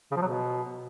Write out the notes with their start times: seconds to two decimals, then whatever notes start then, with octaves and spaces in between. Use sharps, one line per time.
0.11 C#3
0.16 F3
0.22 F#3
0.27 B2